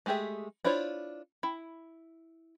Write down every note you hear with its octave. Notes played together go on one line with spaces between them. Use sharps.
G#3 A3 G4 G#4 E5
D4 E4 F4 C5 C#5
E4